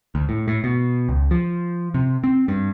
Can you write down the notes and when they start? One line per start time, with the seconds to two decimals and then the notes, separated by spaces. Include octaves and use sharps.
0.15 D2
0.29 A2
0.48 A2
0.64 B2
1.09 C#2
1.31 F3
1.94 C3
2.24 C4
2.48 G2